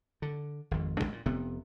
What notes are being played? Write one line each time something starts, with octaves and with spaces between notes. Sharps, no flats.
D3
G#1 F2
G1 G#2 G#3 D4
A#2
F1 C3 B3